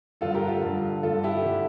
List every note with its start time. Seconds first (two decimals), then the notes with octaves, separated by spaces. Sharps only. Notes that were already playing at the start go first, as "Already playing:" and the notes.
0.21 G2 D3 F4 A4
0.34 G4 A#4
0.48 F4 A4
0.63 G2 D3
1.03 G2 D3 F4 A4
1.23 E4 G4
1.45 D3